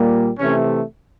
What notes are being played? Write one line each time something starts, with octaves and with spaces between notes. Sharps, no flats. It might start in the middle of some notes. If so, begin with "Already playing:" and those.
Already playing: A#2 G3 A#3
C3 E3 A3 C#4